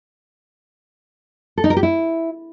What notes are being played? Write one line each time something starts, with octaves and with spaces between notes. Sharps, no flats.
A4
D#4
A#4
G4
E4